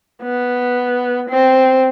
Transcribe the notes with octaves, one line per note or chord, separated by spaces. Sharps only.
B3
C4